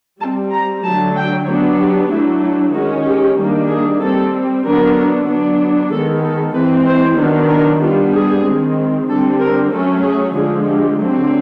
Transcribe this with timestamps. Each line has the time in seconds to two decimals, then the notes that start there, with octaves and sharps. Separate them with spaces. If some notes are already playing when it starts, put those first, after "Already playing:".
0.21 G3 C4 A5
0.52 A#5
0.84 D3 F#3 A3 A5
1.16 G5
1.47 F#3 B3 D4 C#5
1.79 G4
2.11 F#3 A3 D4 E4
2.43 E4
2.74 D#3 G#3 C#4 F#4
3.05 G4
3.37 D#3 G3 A#3 D4
3.70 G#4
4.01 G3 C4 A4
4.64 D3 F#3 B3 D4 A#4
5.28 F#3 B3 D4
5.91 D#3 G#3 B3 A4
6.23 A4
6.54 E3 G#3 C4 B4
6.87 C5
7.18 D#3 F#3 B3 D4
7.50 A#4
7.81 G3 B3 D4 F4
8.13 G#4
8.45 D#3 G#3 C4
9.08 D3 G3 C4 A4
9.40 A#4
9.72 F#3 A3 C#4 A4
10.04 G#4
10.35 D3 F3 G#3 G#4
10.67 G4
10.99 D3 F#3 A3 C4